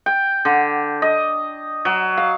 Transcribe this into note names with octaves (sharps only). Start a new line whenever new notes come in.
G5
D3
D#5
F#3
F5